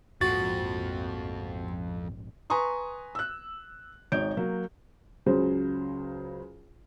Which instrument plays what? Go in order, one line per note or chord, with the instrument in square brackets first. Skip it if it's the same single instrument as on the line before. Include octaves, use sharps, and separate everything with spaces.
[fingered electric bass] A#1 G#2 A#3 [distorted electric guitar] F2 F3 [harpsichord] F#4 [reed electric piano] A6
[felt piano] B4 G#5 A#5 C6 C#6 D#6
E6 F#6
G#1 D#4 C#5 G6 D7
F#3 A#3
[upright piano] C#2 C#3 F#3 C5